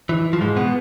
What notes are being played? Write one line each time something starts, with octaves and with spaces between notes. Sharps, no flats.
E3
F3
G#2 G#3
B2 B3